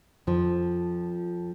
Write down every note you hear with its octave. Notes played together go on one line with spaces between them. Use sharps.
F2 F3